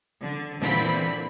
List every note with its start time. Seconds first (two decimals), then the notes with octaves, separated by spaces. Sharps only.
0.20 D3
0.60 A#2 D3 E3 C4 B5